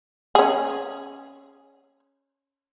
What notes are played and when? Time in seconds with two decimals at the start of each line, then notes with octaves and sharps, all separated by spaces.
0.35 C#4 G#4